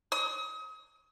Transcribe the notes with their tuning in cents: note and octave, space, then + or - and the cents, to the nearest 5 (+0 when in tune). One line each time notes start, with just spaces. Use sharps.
D#6 +35